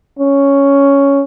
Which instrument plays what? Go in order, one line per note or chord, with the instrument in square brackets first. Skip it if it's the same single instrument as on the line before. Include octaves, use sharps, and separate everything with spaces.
[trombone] C#4